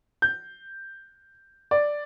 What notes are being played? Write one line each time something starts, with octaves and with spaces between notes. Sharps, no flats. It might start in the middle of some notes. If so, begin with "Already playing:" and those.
G6
D5